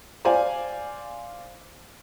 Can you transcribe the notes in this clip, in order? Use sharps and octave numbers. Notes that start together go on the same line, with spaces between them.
C5 D5 F5 G#5